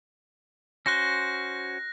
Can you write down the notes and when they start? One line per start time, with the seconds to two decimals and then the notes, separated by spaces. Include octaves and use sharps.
0.86 C#4 F#4 C5 F#6 A#6